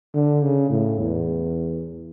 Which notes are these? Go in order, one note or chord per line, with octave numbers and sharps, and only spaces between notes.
D3
C#3
A2
E2